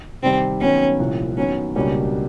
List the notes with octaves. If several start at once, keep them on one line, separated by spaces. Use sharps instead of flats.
C3 D#3 G3 C4
D#3 F#3 B3 C#4
C2 A#2 F3
D#3 F#3 B3 C#4
C#2 B2 G3 A#3 C#4 D4